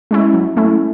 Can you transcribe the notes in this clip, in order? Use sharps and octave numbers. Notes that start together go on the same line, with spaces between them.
G#3 C#4 E4
F#3
A3 C#4 E4